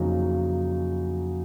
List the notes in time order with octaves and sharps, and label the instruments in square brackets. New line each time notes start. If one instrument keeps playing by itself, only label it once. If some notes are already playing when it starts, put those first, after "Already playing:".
Already playing: [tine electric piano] F2 F3 [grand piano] C#3 F#3 A#3 D#4 F#4